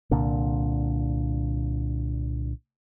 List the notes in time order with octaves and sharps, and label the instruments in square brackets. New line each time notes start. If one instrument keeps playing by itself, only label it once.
[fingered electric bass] C2 A#2 D3